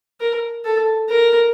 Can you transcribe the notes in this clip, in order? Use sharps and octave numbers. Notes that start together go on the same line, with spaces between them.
A#4
A4
A#4